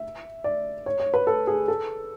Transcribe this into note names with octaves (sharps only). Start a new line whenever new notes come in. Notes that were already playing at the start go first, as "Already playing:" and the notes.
Already playing: E5
D5
C#5
C#5
B4
A4
G#4
A4